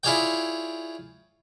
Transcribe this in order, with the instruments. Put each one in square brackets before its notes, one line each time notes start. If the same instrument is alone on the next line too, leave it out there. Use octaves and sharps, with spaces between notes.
[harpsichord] E4 F4 G#4 C#5 D5 G5